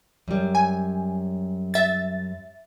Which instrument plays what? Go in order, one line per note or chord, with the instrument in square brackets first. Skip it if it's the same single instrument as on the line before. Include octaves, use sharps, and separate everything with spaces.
[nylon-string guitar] F#2 G3
[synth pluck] G#5
E5 A6